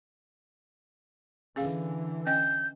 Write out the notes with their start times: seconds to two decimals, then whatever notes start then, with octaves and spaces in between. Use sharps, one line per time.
1.56 D3 E3 C#4 G#4 F5
2.27 C#4 D#5 G5 G6